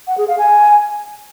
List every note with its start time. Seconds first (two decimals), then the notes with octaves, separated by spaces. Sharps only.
0.07 F#5
0.18 G#4
0.28 F5
0.38 G#5